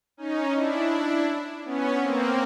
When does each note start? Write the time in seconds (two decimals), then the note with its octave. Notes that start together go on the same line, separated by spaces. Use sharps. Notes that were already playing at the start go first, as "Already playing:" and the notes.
0.17 C#4 D#4
0.55 D4 E4
1.65 B3 C#4
2.02 A#3 C4